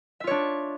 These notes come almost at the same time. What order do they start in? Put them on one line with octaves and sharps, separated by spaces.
E5 F4 C#5 D4